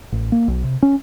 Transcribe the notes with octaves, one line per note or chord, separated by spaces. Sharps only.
A1
A#3
B1
C3
C#4